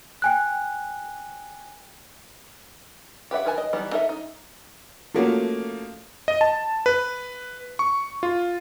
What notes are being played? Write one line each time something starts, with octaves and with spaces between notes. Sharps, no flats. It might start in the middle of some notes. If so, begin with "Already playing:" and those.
G5 G#5 F#6
G4 B4 E5 F#5
D#3 A#4 B4 G#5 A5
D#5
E3 G3 B3 D#4
D#4 A4 A#4 E5
D#4
F3 A3 A#3 C#4 F4 F#4
D#5
A5
B4
C#6
F4